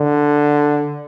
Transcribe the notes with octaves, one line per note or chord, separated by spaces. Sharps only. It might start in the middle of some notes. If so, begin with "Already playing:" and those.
Already playing: D3